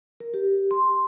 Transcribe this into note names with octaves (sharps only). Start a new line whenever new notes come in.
A#4
G4
C6